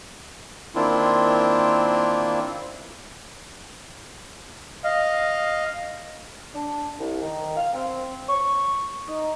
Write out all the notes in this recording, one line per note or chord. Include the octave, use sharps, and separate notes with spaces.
D#3 A#3 C4 D4 E4 F4
D#5 F5
D4
C2
D#3
F5
C4
C#6
D#4